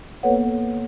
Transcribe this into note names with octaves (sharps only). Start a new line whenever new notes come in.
A#3 B3 A4 B4 C#5 F#5